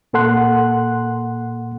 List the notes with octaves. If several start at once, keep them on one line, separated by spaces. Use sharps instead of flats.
A#2 A#3 A4 F#5 C6 F#6